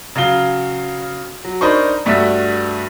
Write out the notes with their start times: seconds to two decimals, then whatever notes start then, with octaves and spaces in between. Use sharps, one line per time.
0.16 C#3 F#3 F5 G7
1.45 F#3
1.61 D4 D#4 A#4 C5 B5 C#6
2.06 G2 A3 D4 F#4 E5 B6